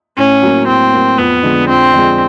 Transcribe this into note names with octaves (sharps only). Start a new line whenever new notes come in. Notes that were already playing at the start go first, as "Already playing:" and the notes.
A2 C#4
F#3 A#3
A2 C4
F#3 A#3
F2 B3
D3 F3 G#3
F2 C4
D3 F3 G#3